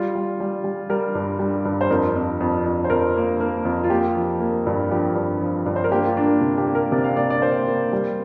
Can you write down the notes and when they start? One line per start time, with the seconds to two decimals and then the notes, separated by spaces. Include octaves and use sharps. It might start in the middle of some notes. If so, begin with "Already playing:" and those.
Already playing: G3 F4
0.15 G3
0.40 G3
0.64 G3
0.90 G3 A#4
1.15 G2
1.39 G3
1.65 G2
1.81 C5
1.90 F2 A#4
2.15 F2
2.41 F2
2.66 F2
2.84 C5
2.90 F2 A#4
3.16 A#3
3.40 A#3
3.65 F2
3.84 F4
3.90 A#3 G4
4.16 F3
4.40 A#3
4.67 G2
4.91 F3 G4
5.16 G2
5.41 F3
5.66 G2
5.76 C5
5.84 A#4
5.91 A#3 G4
6.06 F4
6.17 A#3 D4
6.41 C3
6.58 G4
6.67 A#3
6.75 A#4
6.92 C3 D5
7.04 F5
7.16 A#3 D5
7.30 D5
7.42 A#3 C5
7.67 A#3
7.92 G3